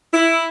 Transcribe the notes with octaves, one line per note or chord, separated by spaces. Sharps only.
E4